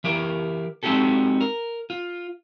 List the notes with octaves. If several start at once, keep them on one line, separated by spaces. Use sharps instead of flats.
E3 G4 A#4
G#3 C4 D#4 F#4 G4 A4
A#4
F4